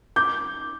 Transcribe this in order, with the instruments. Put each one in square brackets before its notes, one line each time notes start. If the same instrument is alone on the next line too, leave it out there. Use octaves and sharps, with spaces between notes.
[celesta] D6 [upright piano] G6